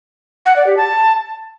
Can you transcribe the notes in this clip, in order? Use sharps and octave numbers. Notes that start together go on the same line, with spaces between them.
F#5
D5
G4
A5